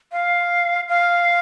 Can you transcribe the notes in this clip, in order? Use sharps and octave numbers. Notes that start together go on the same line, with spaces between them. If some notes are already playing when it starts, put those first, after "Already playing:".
F5
F5